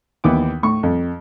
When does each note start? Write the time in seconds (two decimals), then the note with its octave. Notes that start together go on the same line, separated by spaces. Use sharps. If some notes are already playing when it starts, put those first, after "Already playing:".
0.24 D#2 E3 B3 D6
0.63 A2 C#6
0.83 F2